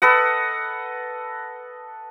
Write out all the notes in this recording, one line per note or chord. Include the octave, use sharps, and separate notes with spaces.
A4 B4 D#5 F#5